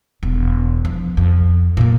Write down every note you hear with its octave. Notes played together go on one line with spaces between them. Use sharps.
E1
F3
F2
A#2 A#3